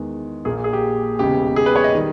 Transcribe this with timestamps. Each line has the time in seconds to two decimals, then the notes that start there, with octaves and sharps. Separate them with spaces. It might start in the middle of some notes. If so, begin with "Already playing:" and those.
Already playing: E2 D#3 G#3
0.45 A#1 A#2 A#3 G#4
0.64 G#4
0.73 G4
1.19 E1 E2 C#3 G4
1.56 G#4
1.66 B4
1.76 C#5
1.84 D#5
1.95 D#3 G3